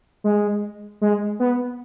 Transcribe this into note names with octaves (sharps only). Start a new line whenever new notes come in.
G#3
G#3
B3